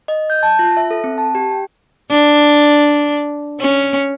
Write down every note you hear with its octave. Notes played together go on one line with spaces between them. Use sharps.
D#5
G6
A5
F4
E5
A4
C4
A5
G4
G5
D4
C#4